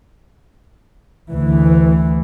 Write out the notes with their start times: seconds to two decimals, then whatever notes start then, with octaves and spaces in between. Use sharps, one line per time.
1.33 D2 E3